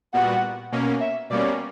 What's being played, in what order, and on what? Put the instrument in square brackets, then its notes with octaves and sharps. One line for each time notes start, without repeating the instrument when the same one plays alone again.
[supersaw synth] A#2 G3 B3 F#4 [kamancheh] F#5
[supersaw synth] B2 A#3 C#4
[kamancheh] E5
[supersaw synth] B2 G3 A#3 C#4 [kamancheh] D5